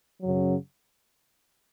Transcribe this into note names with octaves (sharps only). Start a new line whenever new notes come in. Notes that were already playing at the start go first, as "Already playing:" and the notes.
F#2 C#3 F#3